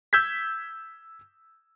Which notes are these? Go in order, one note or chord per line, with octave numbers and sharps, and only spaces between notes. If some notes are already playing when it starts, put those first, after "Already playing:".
E6 G6 G#6 B6